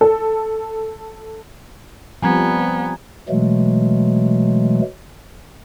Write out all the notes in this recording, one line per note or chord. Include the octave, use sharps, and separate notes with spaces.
A4
F3 G3 B3 C4 G#5 A#5 G#6
B2 E3 F#3 G#3 A3